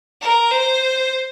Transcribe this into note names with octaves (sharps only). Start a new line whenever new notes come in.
A#4
C5